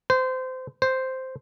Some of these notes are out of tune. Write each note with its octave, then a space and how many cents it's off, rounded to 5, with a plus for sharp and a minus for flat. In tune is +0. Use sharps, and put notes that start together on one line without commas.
C5 -25
C5 -5